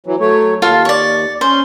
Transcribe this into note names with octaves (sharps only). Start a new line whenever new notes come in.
E3 F#3
F#3 A3 C#5
D#2 F4 A4 F5
C#5 D5
C#4 C5